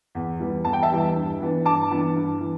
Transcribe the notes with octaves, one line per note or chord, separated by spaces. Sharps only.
E2
E3 G3 B3
E2 A5
G5
E5 A5
E3 G3 B3
G2
E3 B3 D4
G2 A5 D6
E3 B3 D4
G2
E3